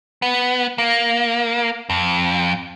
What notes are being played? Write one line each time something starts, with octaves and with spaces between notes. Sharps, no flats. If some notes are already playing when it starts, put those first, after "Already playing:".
B3
A#3
F2